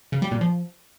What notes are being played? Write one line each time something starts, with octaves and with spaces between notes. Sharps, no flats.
C#3
G3
A#2
F3